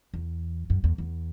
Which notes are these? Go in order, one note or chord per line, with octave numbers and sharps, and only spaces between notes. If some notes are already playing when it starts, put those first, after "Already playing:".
E2
F#2
E2
E2